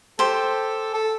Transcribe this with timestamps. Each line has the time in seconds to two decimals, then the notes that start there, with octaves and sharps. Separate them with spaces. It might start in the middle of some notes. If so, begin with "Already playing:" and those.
0.19 G4 A4 C5
0.94 A4